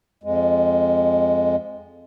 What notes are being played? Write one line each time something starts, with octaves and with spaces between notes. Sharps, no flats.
F2 G#3